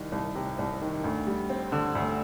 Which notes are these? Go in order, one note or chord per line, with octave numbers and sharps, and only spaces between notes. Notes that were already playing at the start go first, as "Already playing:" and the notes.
Already playing: C2 D#3
C2
C3
C2
D#3
D2
G3
C4
D3
D2